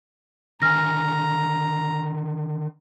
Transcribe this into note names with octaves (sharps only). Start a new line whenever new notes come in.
D3 D#3 G#5 A#5 F6 A#6